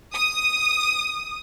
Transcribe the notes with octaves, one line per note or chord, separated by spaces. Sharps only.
D#6